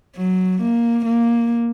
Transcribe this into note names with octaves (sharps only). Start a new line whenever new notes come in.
F#3
A#3
A#3